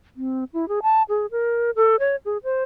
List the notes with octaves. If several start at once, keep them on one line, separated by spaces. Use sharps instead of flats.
C4
E4
G#4
A5
G#4
A#4
A4
C#5
G#4
C5